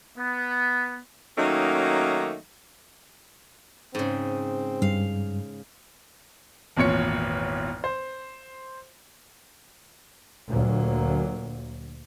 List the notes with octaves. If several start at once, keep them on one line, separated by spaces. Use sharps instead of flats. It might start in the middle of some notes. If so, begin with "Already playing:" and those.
B3
D#3 F#3 A3 A#3 C#4 D#4
G#2 C#3 C4
G2 F5
G#1 E2 A#2 C#5 C#7
C5
D2 A#2 F#3 A#3